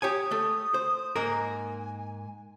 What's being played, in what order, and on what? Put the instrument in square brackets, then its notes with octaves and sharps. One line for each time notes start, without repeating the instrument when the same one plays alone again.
[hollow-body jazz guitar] G4 C#5 G#5 [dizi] D#6
[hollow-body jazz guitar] A3
C5
[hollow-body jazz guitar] G#2 A#3 A#4 [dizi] G#5